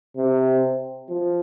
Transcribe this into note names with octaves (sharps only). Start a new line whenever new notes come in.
C3
F3